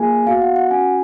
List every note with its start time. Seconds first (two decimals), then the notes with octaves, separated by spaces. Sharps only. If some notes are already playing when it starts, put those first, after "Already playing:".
Already playing: A#3 F4 G#4 G#5
0.26 B3 F#4 F5
0.42 F#5
0.56 F#5
0.71 C#4 F#4 G#5